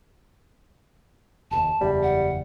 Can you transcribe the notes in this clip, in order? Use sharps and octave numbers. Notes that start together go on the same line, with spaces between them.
F1 D#2 A5
F#1 E2 G3
F#5